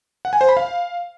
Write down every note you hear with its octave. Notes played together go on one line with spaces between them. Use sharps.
F#5
G#5
C5
B5
F5